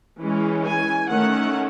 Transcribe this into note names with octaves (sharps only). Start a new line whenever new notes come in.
E3 G#3 C#4
G#5
D#3 A3 C#4 F#5